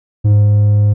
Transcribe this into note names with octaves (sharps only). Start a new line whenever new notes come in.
G#2